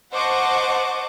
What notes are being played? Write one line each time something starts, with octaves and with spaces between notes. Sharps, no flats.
C5 D#5 F#5 A5 C#6 D6